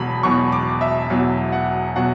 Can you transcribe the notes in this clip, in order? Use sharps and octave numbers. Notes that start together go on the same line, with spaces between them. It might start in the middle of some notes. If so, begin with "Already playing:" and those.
Already playing: E1 E2 B2 F#3 B5
E1 E2 B2 F#3 C#6
D6
E5
E1 E2 B2 F#3
F#5
B2 F#3 F#5